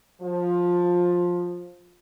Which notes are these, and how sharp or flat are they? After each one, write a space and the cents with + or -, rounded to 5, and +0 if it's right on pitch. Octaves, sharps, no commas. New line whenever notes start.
F3 +15